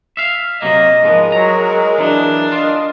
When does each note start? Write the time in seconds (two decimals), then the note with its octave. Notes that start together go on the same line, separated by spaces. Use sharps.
0.17 E5 F5
0.62 C3 F#3 A#3 D#5
1.03 G#2 F3 G#3 B3 A#4
1.32 F#3 A#5
1.98 E3 F#3 D4
2.52 F4 D#5